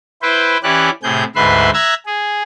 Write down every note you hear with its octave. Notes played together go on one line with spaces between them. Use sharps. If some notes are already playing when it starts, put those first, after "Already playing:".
E4 B4 C5 G5
E3 C#4 E4 G4 D5 F#6
A2 C3 G#4 G6
D2 G#2 B4 E5 B5 C6
E5 A#5 E6 F#6 G#6
G#4